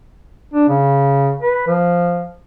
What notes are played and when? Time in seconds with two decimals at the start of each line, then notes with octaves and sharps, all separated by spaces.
0.54 D4
0.69 C#3
1.42 B4
1.67 F3